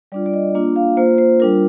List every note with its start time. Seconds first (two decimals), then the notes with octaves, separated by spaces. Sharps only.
0.12 G3 D4 F4 D5
0.26 D5
0.34 D#5
0.55 A#3 D4 F4
0.76 F5
0.97 A#3 F4 C5
1.18 C5
1.40 G3 D4 F4 A#4